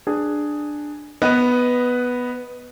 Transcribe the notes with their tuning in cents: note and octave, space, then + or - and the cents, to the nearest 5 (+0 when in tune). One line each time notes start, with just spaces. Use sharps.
D4 +10 G#4 +0
B3 +0 B4 +0 D#5 +10